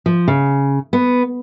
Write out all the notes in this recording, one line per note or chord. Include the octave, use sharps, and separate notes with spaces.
F3
C#3
B3